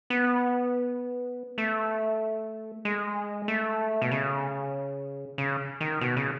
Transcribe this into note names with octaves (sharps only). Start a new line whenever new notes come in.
B3
A3
G#3
A3
B2
C#3
C#3
D#3
B2
C#3